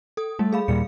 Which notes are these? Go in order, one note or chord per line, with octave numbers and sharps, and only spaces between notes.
A4 D#6
G3 A3
G#4 F5 B5
D#2 A#2 G3 C#7